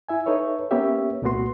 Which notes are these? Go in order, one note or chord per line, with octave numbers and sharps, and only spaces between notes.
E4 E5 G#5
D#4 A4 B4 C#5 E5
A#3 B3 C#4 G4 C#5 E5
C2 A#2 A3 B3 F#4 C6